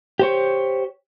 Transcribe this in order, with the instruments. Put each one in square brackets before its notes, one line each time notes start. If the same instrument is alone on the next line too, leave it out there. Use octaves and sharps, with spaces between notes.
[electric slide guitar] G4 C5 C#5